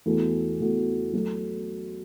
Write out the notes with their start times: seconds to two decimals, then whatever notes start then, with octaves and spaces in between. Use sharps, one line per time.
0.06 E2 E3 A3 F#4
0.60 E2 E3 A3 F#4
1.13 F#3 A3